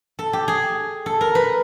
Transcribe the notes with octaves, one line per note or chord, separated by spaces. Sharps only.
A4
G4
G#4
A4
A#4
B4